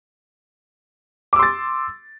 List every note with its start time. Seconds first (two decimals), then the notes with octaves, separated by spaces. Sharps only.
1.33 D6
1.36 E6
1.39 C6
1.43 A6